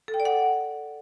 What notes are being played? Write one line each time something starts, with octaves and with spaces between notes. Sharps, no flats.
A4
G5
D5
F#5